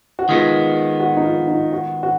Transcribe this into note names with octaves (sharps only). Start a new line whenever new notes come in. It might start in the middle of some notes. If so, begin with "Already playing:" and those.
F#4
D#3 G#3 B3 F4
F#4
D#4
F4
D#4
F#4
F#4